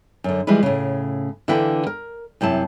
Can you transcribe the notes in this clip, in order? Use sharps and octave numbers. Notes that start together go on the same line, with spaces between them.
F#2 D3
E3 F3 G3 G#3 E4 B4
A2 C#3
D3 E3 A#3 E4 B4 G5
A#4
F#2 C3 E4 A5